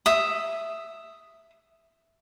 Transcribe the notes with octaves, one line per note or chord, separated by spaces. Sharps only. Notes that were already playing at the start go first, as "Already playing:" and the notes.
E5 D#6